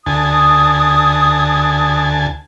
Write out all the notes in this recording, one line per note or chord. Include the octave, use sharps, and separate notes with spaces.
D2 G#5 A5 D#6